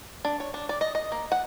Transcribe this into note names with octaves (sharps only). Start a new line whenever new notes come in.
D4
C#5
D4
D5
D#5
D#5
A#3
F#5